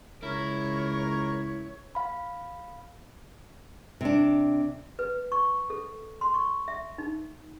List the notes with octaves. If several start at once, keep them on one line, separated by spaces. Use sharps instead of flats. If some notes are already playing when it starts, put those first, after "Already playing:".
C#2 E4 A#4 C#5
F5 B5
C3 D4
B4
C#6
A4
C6
C#6
E5
D#4